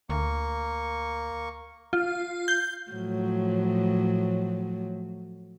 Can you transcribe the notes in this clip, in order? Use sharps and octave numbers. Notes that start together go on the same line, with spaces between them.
D2 A#3 C#6
F4
G6
A2 F3 F#3